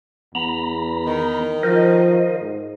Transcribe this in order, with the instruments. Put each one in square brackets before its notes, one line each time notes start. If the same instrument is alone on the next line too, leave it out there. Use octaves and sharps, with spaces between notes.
[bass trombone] E2 [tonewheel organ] B3 A#5 B5
[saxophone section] D#3
[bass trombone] F3 [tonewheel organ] A#4 C5 D#5
[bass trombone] G#2